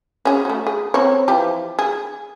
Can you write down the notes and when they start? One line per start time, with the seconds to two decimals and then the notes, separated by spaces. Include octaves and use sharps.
0.25 C#4 G#4
0.45 A3 F#4
0.67 G#4
0.94 C4 C#5
1.28 E3 F3 G4
1.79 G#4